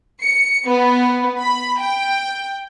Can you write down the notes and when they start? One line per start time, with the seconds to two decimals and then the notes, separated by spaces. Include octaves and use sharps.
0.22 C#7
0.67 B3
1.39 B5
1.79 G5